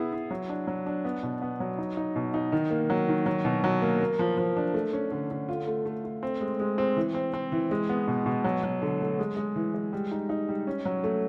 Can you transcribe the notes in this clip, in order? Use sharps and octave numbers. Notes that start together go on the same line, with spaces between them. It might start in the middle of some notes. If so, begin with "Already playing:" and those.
Already playing: B3 E4 G#4
E4
F#3
D4
F#3
D4
B3
B2
B3
F#3
D#4
D#4
B2
D#4
D#3
A#3
F#3
D#3
F#3
B2
F#3
A#3
A#3
F3
F3
D4
A3
C#4
D3
D3
F4
A3
A3
A3
C4
G#3
G#3
C4
E3
C4
C4
E3
G#3
B3
B2
B2
F#3
F#3
D3
A3
G#3
G#3
E3
G#3
G3
D#4
D#4
G3
C#4
F#3
A3